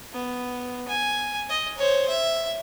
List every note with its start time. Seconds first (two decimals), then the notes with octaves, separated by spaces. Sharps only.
0.13 B3
0.88 G#5
1.49 D#5
1.78 C5 C#5
2.09 E5